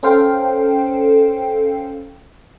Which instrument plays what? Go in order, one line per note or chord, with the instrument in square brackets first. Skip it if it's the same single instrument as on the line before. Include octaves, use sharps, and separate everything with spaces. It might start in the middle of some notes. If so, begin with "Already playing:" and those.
[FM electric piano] C#4 A4 C5 F5 G5